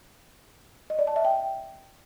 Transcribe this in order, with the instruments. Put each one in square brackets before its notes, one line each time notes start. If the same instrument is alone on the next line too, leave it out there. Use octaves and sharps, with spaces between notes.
[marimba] D#5
D5
A5
E5
G5